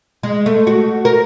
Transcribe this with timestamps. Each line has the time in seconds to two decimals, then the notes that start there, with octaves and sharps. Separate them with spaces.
0.23 G#3
0.46 A3
0.67 F#4
1.05 A#4